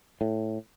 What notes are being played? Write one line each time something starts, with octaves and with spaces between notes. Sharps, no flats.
A2